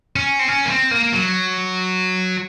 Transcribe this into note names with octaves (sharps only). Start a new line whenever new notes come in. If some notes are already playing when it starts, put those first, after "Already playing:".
C#4
C4
C#4
A#3
C4
A#3
F#3